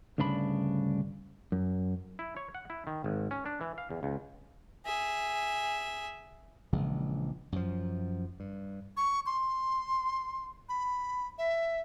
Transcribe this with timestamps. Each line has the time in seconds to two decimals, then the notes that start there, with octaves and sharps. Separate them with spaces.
0.18 D2 G2 C#3 D4 B5
1.52 F#2
2.19 E4
2.37 C#5
2.55 F#5
2.70 E4
2.87 D#3
3.04 G#1
3.31 C#4
3.46 D4
3.61 E3
3.78 F5
3.90 E2
4.03 C#2
4.86 G#4 E5
6.73 A#1 C#3 E3 G#3
7.52 F#2 F3
8.40 G2
8.97 C#6
9.26 C6
10.69 B5
11.38 E5